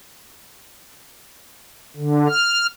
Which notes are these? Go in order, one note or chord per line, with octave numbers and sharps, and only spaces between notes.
D3
F6